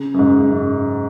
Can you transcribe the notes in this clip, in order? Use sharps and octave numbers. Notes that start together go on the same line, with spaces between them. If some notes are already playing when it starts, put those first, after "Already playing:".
Already playing: C#3
F#2
G#2
F#2